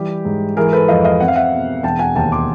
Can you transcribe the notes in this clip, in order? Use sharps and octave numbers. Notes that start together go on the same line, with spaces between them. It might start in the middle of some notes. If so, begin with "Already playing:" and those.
Already playing: E3 G3 G4
G#2
E3 G#4 A#4
A4 B4
F2 D#5 F5
D#5 F5
C4 F#5
F5
E5 F#5
B2
E1 G5 A5
F#5 G#5
D#2 G5 A5
C6 D6